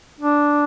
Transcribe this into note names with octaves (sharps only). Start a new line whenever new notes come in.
D4